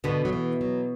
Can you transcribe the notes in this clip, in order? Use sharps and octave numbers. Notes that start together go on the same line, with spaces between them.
B2 D3 B3
F#3
E3
F#3